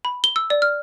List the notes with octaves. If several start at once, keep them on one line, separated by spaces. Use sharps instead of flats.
B5
G7
E6
D5
F6